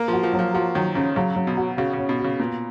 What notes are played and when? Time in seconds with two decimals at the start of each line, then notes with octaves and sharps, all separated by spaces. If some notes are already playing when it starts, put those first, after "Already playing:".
Already playing: A#3
0.08 F3 F#4
0.23 F3
0.33 F#3
0.39 F3
0.54 F3 F#4
0.75 D#3 F#3
0.95 C#3 C#4
1.16 C#3 F#3
1.36 F#3
1.47 B2
1.57 F#4
1.77 C#3 F#4
1.93 C#3
1.98 C#4
2.09 B2
2.19 F#4
2.24 C#3
2.39 A#2 B3